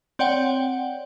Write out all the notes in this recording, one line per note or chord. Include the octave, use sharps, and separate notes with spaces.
C4 C#5 D5 F#5 G5